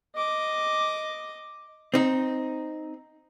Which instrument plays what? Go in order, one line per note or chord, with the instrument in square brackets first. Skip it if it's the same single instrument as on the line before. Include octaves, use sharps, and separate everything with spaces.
[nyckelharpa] D#5 D6
[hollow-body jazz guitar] C4 D#4